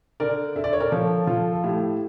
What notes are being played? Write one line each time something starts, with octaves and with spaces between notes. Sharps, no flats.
D3 A#4 D5
D3 E5
D5
C#5
A#4 D5
F3 A4 C#5
F3 F4 A4
A4
A2 E4 G4